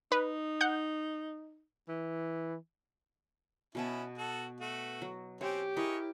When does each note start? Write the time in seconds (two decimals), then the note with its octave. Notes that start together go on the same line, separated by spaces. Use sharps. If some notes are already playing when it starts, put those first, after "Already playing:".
0.12 D#4 B4
0.61 F#5 G6
1.89 E3
3.75 B2 B3 C#4 E4 A5
4.18 F#4 A4
4.60 A3 F#4
5.02 F#3
5.41 C4 C#4 G4 C#5
5.76 E4 G#4 A#4 C#5 D#5